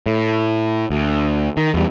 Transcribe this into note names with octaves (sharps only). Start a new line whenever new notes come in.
A2
D2
D#3
E2 G3